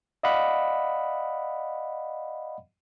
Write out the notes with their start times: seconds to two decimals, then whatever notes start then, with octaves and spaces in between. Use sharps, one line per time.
0.23 D5 D#5 F5 F#5 B5